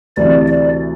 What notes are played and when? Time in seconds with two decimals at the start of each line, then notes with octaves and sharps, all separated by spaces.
0.17 D2 C3 E3 D5
0.48 D5